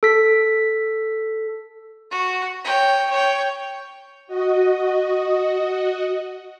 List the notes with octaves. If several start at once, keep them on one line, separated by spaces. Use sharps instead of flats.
A4 B6
F#4
C#5 G5
C#5 G5
F#4 D#5